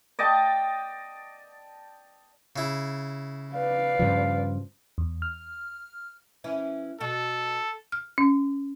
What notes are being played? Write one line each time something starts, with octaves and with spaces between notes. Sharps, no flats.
D5 D#5 G5 A5
C#3 E4
B4 D5 F5
G2 C#3 F3
E2
F6
E3 C#4 E4
B2 F#4 A4
F6
C#4